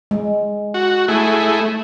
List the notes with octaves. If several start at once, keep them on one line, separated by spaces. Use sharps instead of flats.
G#3
F#4
A3 E4 G#4